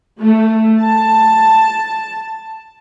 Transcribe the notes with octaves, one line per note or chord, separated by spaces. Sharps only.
A3
A5